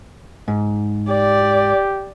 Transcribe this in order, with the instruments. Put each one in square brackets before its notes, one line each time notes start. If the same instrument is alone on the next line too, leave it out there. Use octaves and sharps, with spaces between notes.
[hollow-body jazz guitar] G#2
[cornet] G4 [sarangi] D5